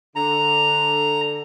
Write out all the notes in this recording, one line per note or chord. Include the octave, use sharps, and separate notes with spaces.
D3 A#5